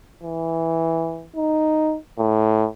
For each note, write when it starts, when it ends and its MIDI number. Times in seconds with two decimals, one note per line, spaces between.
0.23 1.27 52
1.36 1.97 63
2.19 2.67 45